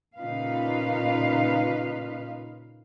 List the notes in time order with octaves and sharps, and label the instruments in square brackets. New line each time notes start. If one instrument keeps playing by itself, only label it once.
[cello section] A#2 C#3 D#4 F4 B4 F5